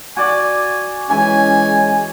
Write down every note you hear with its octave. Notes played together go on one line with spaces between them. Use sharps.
F#4 D5 G#5
E3 G#3 C#4 G#5